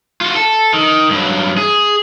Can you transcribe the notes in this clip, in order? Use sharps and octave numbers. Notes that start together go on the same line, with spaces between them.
F4 F#4
A4
D#3
G2 F#3
G#4